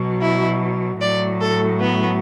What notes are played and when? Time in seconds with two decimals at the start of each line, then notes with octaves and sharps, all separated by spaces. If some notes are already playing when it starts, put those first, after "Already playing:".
Already playing: B2 F#3
0.21 E4
1.00 A2 F#3 D5
1.41 A4
1.81 B3